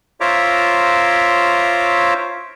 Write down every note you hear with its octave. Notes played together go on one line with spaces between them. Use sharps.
F4 C5 C#5 E5 A#5 D6